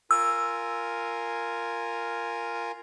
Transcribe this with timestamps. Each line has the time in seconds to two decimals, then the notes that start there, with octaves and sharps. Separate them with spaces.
0.11 F4 A#4 G#5 E6